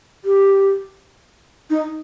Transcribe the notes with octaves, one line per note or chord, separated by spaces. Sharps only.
G4
D#4